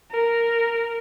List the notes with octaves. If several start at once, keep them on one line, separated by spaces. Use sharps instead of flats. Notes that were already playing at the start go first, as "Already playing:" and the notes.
A#4